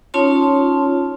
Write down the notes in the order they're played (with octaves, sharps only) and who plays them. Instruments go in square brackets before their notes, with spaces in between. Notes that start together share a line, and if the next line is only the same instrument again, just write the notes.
[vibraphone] C#4 D#4 F4 C#5 A5 C6